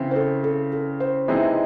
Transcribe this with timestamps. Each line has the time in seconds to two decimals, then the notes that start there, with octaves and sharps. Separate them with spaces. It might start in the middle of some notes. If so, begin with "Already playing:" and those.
Already playing: C#3 E3 C4
0.11 C5
0.16 A4
0.44 A4
0.73 A4
1.00 C5
1.28 C3 E3 G#3 C4 D#4